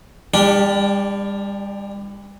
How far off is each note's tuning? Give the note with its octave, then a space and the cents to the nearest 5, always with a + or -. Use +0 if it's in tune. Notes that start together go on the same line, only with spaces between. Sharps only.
G3 +40 D4 +0 G4 +0